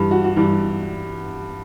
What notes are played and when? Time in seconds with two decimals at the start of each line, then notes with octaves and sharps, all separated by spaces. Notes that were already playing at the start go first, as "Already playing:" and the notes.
Already playing: G2 E3 G3
0.11 F#4
0.24 F#4
0.36 G2 E3 G3